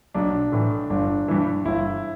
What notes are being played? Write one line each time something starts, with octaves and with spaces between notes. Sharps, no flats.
B1 D4
A2 E3
G1 D4
G2 E3
G1 E4